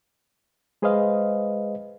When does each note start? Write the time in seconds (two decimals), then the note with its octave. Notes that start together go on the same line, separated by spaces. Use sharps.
0.82 G#3 G#4 B4 C5 D#5 F5